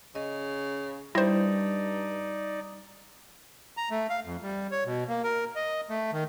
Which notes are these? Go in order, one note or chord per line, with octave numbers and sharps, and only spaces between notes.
C#3 D#5
G2 G3 D#4 E4 C5 D5
A#5
A3
F5
F2
G3
C#5
B2
A#3
A#4
D#5
A3
D#3